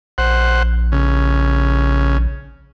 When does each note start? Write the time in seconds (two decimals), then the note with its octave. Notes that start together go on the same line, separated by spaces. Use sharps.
0.18 A#1 C5 F#5
0.92 C#3